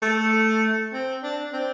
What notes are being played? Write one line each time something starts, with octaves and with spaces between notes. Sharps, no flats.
A3
C4
D4
C4